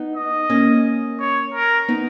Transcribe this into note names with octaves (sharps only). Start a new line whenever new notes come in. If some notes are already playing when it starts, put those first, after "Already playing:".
Already playing: B3 D#4
D#5
A#3 C#4
C#5
A#4
B3 D#4